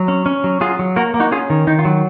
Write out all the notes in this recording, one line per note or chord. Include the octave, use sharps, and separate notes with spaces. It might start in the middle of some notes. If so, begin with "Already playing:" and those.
Already playing: F#3
C#4
C#4
F#3
F#3 F4 G#4
F#3
A#3 F#4 A#4
A#3
D#4 F#4
C#4 F4 G#4
D#3
D#3 D#4
F4
F#3